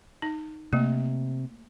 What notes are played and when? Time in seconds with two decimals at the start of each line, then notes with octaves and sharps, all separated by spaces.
0.22 D#4
0.73 C3 A3 A#3